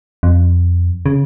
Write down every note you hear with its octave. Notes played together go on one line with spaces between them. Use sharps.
F2
C#3